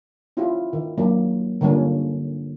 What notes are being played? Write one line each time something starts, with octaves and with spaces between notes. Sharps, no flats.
C#4 E4 F4 G4
D#3
F#3 A#3 D4
D3 G3 A#3 C#4 F4